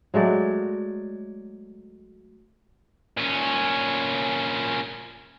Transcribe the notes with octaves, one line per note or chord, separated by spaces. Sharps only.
F#3 G#3 A3 D5
A#2 C#4